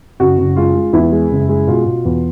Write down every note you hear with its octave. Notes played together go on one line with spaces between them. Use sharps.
F#1 F#4
F#1
G#3 F4
G#3
E2 E4
G#3
F#1
G#3
B2 F4
B2
E2